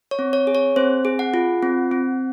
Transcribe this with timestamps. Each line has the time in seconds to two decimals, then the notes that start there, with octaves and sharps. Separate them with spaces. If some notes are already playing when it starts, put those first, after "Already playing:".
0.11 C#5
0.19 C4
0.33 C#5
0.47 G#4
0.55 C#5
0.76 C4 C5
1.05 G#4
1.19 F#5
1.34 F4
1.63 C4
1.91 C4